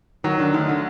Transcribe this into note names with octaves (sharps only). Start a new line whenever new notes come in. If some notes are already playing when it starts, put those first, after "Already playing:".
D#3 F#3
D3 D#3
D2 D#3
D3